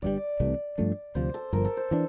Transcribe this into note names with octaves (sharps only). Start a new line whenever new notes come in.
G1 G2 D3 G3 D5
C2 C3 E3 A3
G2 F3 A3 D4
D2 C3 F3 C5
A4
G1 G2 F3 A#4
A4
C5
E3 A#3 D4